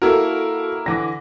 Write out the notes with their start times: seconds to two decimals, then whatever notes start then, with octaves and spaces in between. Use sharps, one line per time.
0.02 A#3 E4 F#4 A4 A#4
0.86 D3 E3 D6 A#6